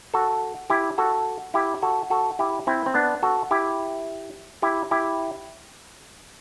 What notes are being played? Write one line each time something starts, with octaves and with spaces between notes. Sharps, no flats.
F#4 A4
E4 G4
F#4 A4
E4 G4
F#4 A4
F#4 A4
E4 G4
C4 E4
C4
B3 D4
F#4 A4
E4 G4
E4 G4
E4 G4